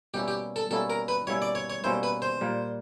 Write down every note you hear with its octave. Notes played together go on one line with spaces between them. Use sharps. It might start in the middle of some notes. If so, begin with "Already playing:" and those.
B2 G3 A#3 C#4 E4 G4
G4
A4
B2 G3 A#3 C#4 E4 A4
A#4
B4
B2 G3 A#3 C#4 E4 C#5
D5
C#5
C#5
B2 G3 A#3 C#4 E4 C5
B4
C5
A#2 G3 A#3